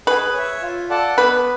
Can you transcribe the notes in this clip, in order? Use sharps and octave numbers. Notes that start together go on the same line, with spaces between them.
G#4 B4
C#5 E5
F4
A4 D5 F#5 A5
B3 B4